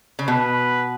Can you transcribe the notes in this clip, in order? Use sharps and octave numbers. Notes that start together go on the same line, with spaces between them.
C#3
B2 B4